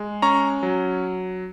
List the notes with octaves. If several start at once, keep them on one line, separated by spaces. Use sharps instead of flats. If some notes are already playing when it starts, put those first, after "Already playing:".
Already playing: G#3
C#4 A#5 C#6
F#3